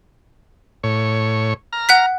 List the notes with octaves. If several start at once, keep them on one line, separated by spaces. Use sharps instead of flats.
A2 C#5
A#5 F6
F#5 F#6 B6